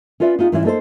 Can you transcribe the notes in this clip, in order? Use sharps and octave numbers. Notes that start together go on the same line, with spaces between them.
C#4 F4 B4 D5 E5
B3 D#4 F4 G#4
G#2 E3 G#3 C#4 E4
A#3 D#4 A4 B4 C5